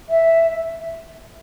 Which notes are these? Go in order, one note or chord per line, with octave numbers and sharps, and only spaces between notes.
E5